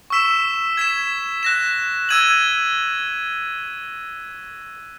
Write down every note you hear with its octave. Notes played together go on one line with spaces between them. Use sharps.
C#6 E6 B6 E7
G#6 B6 E7
F#6 A#6 E7
E6 G#6 D#7 F#7